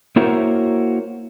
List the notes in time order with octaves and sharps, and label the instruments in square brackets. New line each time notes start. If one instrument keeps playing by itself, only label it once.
[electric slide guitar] A#3 E4 F#4 A#4 C5 C#5